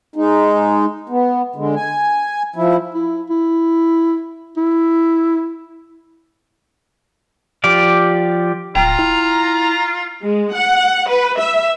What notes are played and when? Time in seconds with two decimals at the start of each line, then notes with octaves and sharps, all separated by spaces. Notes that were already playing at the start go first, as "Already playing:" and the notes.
0.16 G#3 D#4
1.09 B3
1.56 D3 G#3
1.76 G#5
2.56 F3 E4
2.94 E4
3.30 E4
4.57 E4
7.64 F3 G4 D5 F5
8.76 D1 F4 G5 A#5
8.99 E4
10.23 G#3
10.54 F#5
11.10 B4
11.38 E5